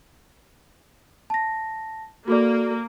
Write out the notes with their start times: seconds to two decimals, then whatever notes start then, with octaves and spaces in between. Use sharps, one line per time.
1.30 A5 A#6
2.28 A#3 F#4 A4 D5